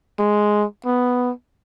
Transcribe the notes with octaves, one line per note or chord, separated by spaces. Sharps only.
G#3
B3